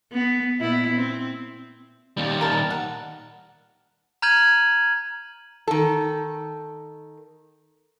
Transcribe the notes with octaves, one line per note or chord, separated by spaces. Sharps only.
B3
A#2 B3 E4
C4
D#2 G3
A#4 A5
F#5
A#5 F6 G6 G#6 D#7 F#7
D#3 A4